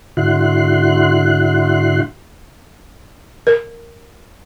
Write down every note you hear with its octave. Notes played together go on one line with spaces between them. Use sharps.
G#2 D3 E4 F#4 C6 F#6
A#4